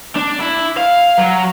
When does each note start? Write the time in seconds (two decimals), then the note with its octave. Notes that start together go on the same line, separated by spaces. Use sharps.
0.16 D4
0.41 E4
0.77 F5
1.18 F#3